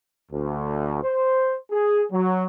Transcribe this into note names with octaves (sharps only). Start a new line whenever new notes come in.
D2
C5
G#4
F#3